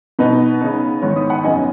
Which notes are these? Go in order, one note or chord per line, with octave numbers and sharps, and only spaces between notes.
B2 B3 D#4 B4
C#3 B3 D#4
G#2 D#3 B3 C#5
B5 D#6
F#5 B5
F#2 C#3 B3 D#4 D#5 G#5